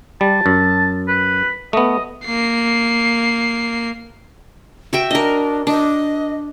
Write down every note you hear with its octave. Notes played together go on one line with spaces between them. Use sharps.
G3 A5
F#2
B4
A3 B3 D#5
A#3 C7
F#4 E5 G5
D4 A#4 D#5
D4 D#5